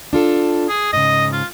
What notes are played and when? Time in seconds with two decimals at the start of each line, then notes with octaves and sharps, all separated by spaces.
0.13 D4 F4 A4
0.69 G#4
0.93 G#2 C#3 D#5
1.33 F4